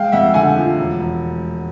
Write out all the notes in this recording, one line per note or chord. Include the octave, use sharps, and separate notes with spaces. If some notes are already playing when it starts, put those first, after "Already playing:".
Already playing: G#3 F5 G5
F2 E5 F#5
D3 F#5 G#5
F3
E1
E1